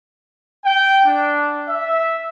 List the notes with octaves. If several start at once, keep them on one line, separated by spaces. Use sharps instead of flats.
G5
D4
E5